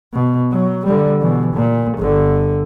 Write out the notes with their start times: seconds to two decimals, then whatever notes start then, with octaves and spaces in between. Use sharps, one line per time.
0.14 B2
0.52 F#3
0.86 D3 G3
1.21 B2 E3
1.54 A#2
1.98 G1 D3